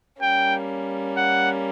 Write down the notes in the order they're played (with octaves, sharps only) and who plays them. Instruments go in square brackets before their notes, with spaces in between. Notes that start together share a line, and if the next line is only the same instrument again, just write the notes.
[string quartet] G3 A#3 C#4 [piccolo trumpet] G5
[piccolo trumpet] F#5